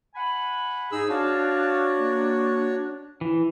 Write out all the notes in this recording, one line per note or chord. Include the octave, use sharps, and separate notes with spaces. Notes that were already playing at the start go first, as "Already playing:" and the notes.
F#5 G#5 B5
G#2 D#4 G#4 E6
D4 F#4 C#5 F5 A5
A#3
E3